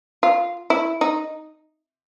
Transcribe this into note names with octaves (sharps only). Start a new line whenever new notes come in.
F4
E4
D#4